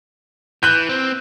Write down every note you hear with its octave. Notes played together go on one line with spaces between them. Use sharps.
E3 F#6 G6
C4